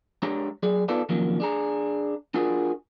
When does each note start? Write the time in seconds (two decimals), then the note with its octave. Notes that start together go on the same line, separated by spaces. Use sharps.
0.23 G#3 D4 G4 C#5 A#5
0.63 F#3 G#4 D5
0.88 B3 D#4 F4 A4 B4 D5
1.09 C3 D#3 F3 F#3 A#3 C#4
1.40 D4 G#4 A#5
2.34 D4 F4 F#4 G#4 A#4